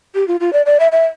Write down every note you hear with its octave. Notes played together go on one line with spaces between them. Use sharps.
G4
F4
F4
D5
D5
E5
E5